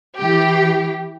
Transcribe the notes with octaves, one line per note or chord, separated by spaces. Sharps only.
E3 G4